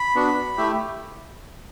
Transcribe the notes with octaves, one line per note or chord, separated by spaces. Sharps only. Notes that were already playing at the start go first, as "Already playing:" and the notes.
Already playing: B5
B3 D4 F#4
A3 E4 G4